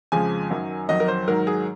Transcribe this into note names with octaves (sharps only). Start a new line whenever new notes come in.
F2 C#3 F3 G#3 G#5
F#2 D#3 F#3
F2 D#3 F#3 D#5
A#4
C5
G#2 D#3 F#3 A#4
G#4